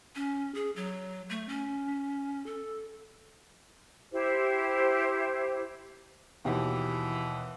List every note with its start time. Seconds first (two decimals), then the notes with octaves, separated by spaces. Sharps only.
0.16 C#4
0.55 G#4
0.76 F#3
1.30 A3
1.49 C#4
2.46 A4
4.12 E4 G4 C5
6.45 D#2 B2 E3 G4